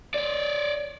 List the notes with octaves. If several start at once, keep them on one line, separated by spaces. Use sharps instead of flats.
C#5 D5